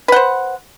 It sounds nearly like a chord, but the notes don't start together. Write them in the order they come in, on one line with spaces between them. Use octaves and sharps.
B4 F#5 C5